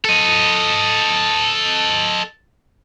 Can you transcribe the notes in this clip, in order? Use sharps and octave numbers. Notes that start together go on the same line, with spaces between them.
A4 D#5